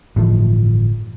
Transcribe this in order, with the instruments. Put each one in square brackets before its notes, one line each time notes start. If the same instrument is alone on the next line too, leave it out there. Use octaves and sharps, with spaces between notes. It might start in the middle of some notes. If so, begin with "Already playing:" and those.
[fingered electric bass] G1 A2 E3 F3